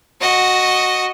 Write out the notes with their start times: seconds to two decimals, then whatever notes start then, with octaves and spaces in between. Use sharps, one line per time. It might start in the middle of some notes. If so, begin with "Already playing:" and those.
0.21 F#4 D#5